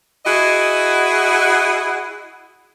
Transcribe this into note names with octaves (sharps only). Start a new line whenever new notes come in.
E4 F#4 G#4 D#5 F#5